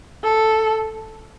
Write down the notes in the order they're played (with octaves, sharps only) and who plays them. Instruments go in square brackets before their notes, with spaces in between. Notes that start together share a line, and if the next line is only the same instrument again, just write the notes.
[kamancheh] A4